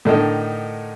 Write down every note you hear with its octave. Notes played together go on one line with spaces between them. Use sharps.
A2 D3 D#3 D#4